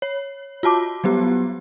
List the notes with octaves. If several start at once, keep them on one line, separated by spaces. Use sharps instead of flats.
C#5
F4 F#4 A5 D6
F#3 G3 B3 G4